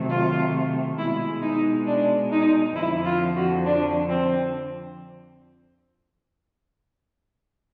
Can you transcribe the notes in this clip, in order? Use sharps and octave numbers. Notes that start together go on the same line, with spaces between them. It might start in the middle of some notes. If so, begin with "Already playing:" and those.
Already playing: C3 D#3 F#3 A3
F4
B2 G#3 E4
D#4
D4
D#4
F2 D3 F3 E4
F4
F#4
D4
C4